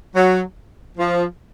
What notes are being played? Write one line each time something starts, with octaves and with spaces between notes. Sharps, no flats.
F#3
F3